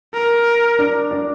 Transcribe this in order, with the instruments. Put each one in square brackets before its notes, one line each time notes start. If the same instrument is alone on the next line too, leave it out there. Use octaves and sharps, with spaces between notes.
[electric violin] A#4
[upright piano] D4
D4